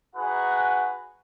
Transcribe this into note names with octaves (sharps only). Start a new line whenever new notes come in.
D#4 F#4 G#4 B4 F#5 G#5